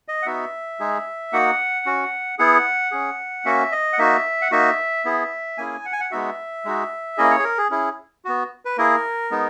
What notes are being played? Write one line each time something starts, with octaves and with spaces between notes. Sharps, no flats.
D#5
F#5
B3 D#4 F#4 E5
G#3 D#4 G#4
A#3 D#4 F#4 F#5
C#4 F#4
B3 E4 G#4 F#5
C#4 G#4
A#3 C#4 F#4 E5
D#5
F#5
A#3 D#4 F#4 E5
F#5
A#3 D#4 F#4 E5
B3 E4 G#4
A#3 C#4 E4 G#4 G#5
F#5
G#5
F#5
G#3 B3 D#4 F#4 E5
G#3 D#4 F#4
A#3 C#4 E4 G#4 D#5
C#5
G#4
A#4
G#4
C#4 E4 G#4
B3 F#4
B4
A#3 E4 G#4 A#4
G#3 B3 D#4